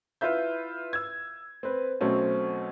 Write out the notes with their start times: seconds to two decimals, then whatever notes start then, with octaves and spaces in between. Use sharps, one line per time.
0.21 E4 F4 B4 E5 G6
0.93 E6 G#6
1.63 C4 B4
2.01 B2 F#3 A3 C4 C#4